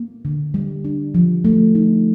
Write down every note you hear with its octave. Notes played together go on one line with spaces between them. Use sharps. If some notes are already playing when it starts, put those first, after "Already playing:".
Already playing: A#3
D3
G3
D4
F3
A3
D#4